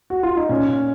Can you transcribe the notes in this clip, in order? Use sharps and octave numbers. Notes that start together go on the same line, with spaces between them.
F#4
F4
D#4
A#2 C#4